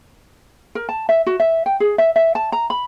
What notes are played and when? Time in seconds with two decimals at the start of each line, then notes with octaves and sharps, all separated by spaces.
0.75 A#4
0.89 A5
1.09 E5
1.27 F#4
1.40 E5
1.66 G5
1.80 G#4
1.98 E5
2.16 E5
2.35 A5
2.52 A#5
2.70 B5